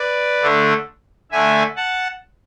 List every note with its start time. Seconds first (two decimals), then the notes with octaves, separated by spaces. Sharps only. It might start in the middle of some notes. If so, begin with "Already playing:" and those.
Already playing: B4 D5
0.42 D3 A3 D4
1.31 D3 A3 D4 E5 G#5
1.76 F#5 A5